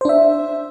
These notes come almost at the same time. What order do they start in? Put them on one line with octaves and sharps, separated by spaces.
C5 D4 E5